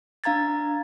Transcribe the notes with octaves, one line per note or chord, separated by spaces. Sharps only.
D4 F5 A#5 G#6 A6